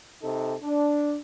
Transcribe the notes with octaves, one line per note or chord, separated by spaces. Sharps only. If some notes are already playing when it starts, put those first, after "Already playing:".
C3 D#4 A4
D4